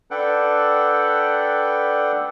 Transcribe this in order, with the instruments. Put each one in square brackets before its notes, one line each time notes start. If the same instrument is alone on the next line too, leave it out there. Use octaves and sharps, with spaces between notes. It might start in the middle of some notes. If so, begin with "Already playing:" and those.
[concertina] D4 A4 B4 F#5 G5